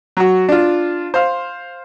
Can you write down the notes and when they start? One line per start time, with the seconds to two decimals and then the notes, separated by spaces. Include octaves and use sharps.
0.17 F#3 F#4
0.49 D4 F4
1.14 C5 F5